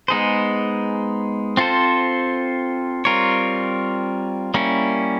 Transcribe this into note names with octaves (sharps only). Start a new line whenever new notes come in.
G#3 B3 D#4 G#4 C5
C4 F4 A4 C5
G3 C4 F4 A#4 C#5
G3 A#3 C#4 E4